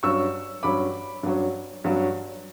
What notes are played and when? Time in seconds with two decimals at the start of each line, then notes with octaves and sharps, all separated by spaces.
0.03 G2 F#3 C#4 C#6 E6
0.63 G2 F#3 C#4 B5 D6
1.23 G2 F#3 C#4
1.84 G2 F#3 C#4